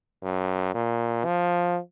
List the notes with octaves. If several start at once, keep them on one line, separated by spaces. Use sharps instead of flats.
F#2
A#2
F3